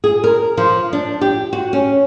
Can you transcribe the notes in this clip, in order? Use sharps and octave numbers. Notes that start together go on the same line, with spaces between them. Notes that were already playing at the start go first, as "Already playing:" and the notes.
G#4
A#4
F3
D4
G4
F#4
C#4